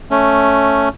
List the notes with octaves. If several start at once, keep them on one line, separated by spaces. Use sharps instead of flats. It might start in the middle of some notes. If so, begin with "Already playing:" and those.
A3 C#4